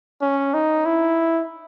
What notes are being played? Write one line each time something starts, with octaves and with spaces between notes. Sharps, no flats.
C#4
D#4
E4